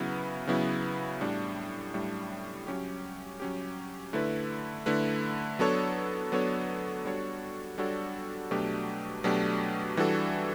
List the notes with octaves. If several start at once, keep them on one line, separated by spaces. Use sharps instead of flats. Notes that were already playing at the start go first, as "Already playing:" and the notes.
Already playing: C#3 F#3 B3 E4
C#3 F#3 B3 E4
A2 G3 D4
A2 G3 D4
F#3 C#4 G4
F#3 C#4 G4
D3 A3 E4 B4
D3 A3 E4 B4
F#3 B3 D4 A4 C#5
F#3 B3 D4 A4 C#5
G3 D4 F#4 A4 C#5
G3 D4 F#4 A4 C#5
B2 F#3 A3 D4 G4
B2 F#3 A3 D4 G4
E3 G3 D4 F#4 A4